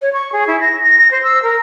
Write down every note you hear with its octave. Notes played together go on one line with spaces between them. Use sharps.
C#5
C#6
G#4
E4
A#6
A#6
A#6
C5
E6
A#4